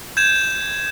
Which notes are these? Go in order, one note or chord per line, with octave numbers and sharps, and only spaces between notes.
G6 G#6 E7